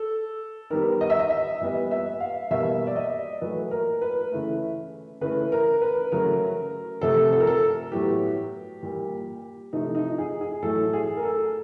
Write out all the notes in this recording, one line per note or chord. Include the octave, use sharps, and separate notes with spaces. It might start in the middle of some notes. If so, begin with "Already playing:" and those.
Already playing: A4
D#3 G3 B3 A#4
D#5
E5
D#5
E5
A#2 G3 B3
E5
F5
B2 G3 A#3 E5
D5
D#5
A#2 F#3 A3 B4
A#4
B4
C#3 E3 A3
C#3 E3 A3 B4
A#4
B4
C#3 F#3 A3 A#4
C3 F3 A3 A4
A4
A#4
A4
A2 F#3 B3 G4
A#2 G3 A#3
C3 F3 A3 D#4
D#4
G#4
G#4
A2 F#3 A3 A4
G#4
A#4
A4